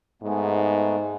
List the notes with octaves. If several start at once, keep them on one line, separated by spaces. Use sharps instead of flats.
G#2 G#3 A3 B3